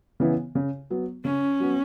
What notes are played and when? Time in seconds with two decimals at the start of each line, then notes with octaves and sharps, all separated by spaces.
0.20 C#3 E3 B3 E4
0.55 C#3
0.90 F#3 B3
1.25 C#3 C#4
1.60 F#3 B3